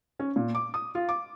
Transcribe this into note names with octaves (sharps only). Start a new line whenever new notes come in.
C#4
A#2
D6
D#6
F4
D6